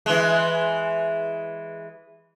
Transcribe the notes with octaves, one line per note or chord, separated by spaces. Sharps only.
E3 G#3